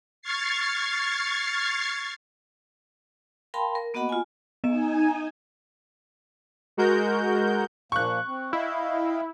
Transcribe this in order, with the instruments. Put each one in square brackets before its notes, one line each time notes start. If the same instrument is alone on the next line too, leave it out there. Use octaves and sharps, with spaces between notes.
[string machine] C#6 F6 G#6 A6 C7
[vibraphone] A#4 F5 G5 A5 B5 C6
A#4
A#3 B3 F#4 D#5 F#5 B5
F4 G#5
[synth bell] B3 D#5 E7 [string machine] D#4 G#5
[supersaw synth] G#3 F#4 A#4 G6
[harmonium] A#2 F3 A#3 [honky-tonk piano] C#6 F#6
[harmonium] C4
[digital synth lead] E4 [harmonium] D#5 F5 G5